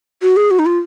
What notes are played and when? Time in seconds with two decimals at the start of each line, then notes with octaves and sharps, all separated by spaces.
0.22 F#4
0.36 G#4
0.51 F#4
0.59 D#4
0.66 F4